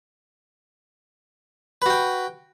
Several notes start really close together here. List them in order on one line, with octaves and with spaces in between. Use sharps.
B4 F#4 G5